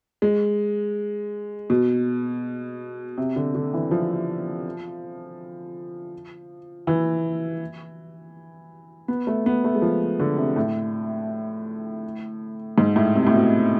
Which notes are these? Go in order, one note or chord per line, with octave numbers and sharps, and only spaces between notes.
G#3
B2
C3
D3
D3
E3
F3
E3
B3
A3
B3
A3
G#3
F3
D3
C3
A2
G#2
A2
C3
A2
B2